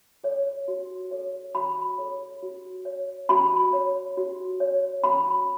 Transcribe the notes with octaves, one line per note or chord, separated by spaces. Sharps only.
A4 C#5
F#4
A4 C#5
F#4 B5
A4 C#5
F#4
C#5
F#4 B5
C#5
F#4
C#5
F#4 B5